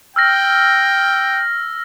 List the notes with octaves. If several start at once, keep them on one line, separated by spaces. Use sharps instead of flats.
G5 E6 F6 A#6